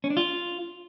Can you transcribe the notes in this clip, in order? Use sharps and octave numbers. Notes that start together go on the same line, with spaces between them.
C#4
D4
F4